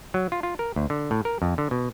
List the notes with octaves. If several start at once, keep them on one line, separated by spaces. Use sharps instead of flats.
F#3
F4
F4
A#4
D2
D3
A2
A#4
F2
D3
B2